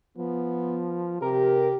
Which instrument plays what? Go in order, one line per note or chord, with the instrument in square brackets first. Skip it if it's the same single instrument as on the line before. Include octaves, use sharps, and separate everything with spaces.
[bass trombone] F3 [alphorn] B3
[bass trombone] C3 [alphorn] G4 [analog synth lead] A#4